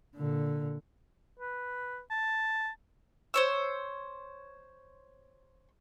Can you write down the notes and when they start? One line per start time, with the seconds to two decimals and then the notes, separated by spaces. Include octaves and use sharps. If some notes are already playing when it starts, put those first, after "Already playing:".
0.16 A#2 D3
1.39 B4
2.10 A5
3.34 C5 C#5 E6